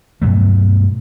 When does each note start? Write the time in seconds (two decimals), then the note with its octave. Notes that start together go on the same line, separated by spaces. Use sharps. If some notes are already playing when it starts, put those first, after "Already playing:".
0.22 G2 B2 F#3 A3